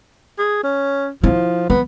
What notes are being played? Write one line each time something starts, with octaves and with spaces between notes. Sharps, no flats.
G#4
C#4
F3 E4
F3 B3